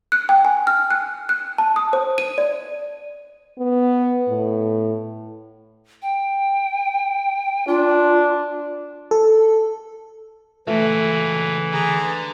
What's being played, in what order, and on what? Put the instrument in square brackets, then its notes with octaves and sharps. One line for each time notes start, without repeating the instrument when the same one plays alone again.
[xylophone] F#6
G5
G#5
F6
F#6
F#6
A5
D#6
C5
D#7
D5
[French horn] B3
A2
[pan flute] G5
[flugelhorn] D4 [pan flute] F4
[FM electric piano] A4
[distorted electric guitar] C#2 F#4 [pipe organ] E3 [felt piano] A3
[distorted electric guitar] D3 [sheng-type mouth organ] G#4 A#5